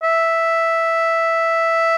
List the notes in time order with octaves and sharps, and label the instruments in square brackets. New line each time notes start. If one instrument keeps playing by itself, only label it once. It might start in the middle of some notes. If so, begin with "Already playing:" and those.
[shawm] E5